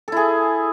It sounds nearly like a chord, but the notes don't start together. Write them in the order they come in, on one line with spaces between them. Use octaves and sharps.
A4 E4 G#4